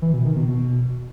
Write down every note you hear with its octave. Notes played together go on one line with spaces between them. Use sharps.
E3
B2
D#3
B2
B2